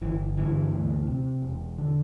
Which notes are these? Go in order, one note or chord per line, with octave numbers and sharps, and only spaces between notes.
G1 E3
G2 D3 E3
D2
C3
E1
D3